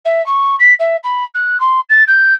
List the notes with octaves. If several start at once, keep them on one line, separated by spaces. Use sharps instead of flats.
E5
C#6
B6
E5
B5
F#6
C6
A6
G6